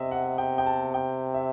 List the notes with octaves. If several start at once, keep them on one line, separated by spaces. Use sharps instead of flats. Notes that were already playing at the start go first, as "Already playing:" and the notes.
Already playing: C3 D#5 E5
F#5
G5
G5
A5
G5
E5